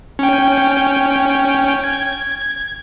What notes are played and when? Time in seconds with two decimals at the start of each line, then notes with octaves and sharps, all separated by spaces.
0.19 C#4 G5
1.84 G#6